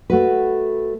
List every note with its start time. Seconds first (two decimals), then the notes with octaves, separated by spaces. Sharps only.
0.10 A3 F#4 B4